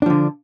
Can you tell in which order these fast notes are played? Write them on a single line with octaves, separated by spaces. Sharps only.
D4 F3 D3